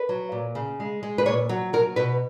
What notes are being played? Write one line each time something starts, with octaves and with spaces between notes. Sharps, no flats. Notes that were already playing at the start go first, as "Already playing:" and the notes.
Already playing: B4
F#3
A#2
C#3
G#3
G#3
B4
A#2 C#5
F#3
F#3 A#4
B2 B4